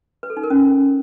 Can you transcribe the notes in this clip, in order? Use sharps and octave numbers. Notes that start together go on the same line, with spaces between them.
B4
A4
D#4
A#4
C#4